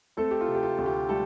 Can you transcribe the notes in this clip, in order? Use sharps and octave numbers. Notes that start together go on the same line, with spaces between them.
A3 C4 A4
G4
F4
C3
G4
F4
D2
G4
G3 A3 A4